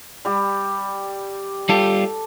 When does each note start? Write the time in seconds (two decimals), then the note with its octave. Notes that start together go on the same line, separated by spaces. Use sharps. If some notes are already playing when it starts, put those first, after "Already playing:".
0.25 G3 G4
1.69 G3 F4 G4 A4